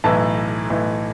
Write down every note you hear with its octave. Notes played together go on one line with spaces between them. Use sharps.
B1 A2 E3 A5
B1 A2 E3